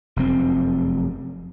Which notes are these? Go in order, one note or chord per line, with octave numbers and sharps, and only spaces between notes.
F1 F#2 C4